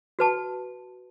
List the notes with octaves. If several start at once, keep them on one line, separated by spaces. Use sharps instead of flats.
F#4 B4 A5